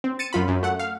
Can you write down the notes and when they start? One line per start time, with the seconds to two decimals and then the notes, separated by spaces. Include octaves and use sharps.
0.04 C4
0.19 A6 C#7 D#7 E7
0.33 F#2 F4 B5
0.48 F#2
0.63 A3 F#5
0.79 F5